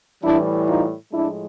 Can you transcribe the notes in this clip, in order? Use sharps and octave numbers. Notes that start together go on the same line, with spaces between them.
A2 E3 G3 D4 E4
D#4 F4
A2 F3 G#3 D4 E4